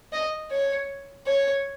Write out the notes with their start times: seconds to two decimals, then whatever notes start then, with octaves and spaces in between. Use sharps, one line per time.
0.13 D#5
0.51 C#5
1.27 C#5